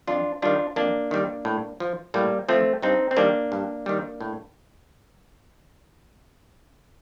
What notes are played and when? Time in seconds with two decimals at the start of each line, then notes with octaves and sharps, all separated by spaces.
0.07 F2 D4 F4
0.42 D#3 G3 D4 F4
0.76 F2 A#3 D4
1.11 D#3 G3
1.45 A2
1.80 F3
2.14 A2 G3 A#3
2.48 F3 A3 C4
2.82 G2 C4 D#4
3.11 C4
3.17 D#3 G3 A#3 D4
3.52 G2
3.86 D#3 G3
4.21 A2